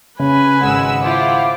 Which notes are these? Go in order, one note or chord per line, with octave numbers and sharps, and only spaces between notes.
C#3 C#4 B4 G#5
G#1 G#3 F#5 E6
E4 F4 C5 D6